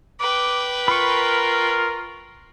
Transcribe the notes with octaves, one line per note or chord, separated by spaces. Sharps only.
B4 G5 D6
F4 A#4 B5 C#6